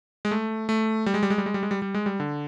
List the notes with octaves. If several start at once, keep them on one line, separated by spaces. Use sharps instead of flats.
G#3
A3
A3
G3
G#3
G3
G#3
G3
G#3
G3
G#3
G3
G3
G#3
G3
D3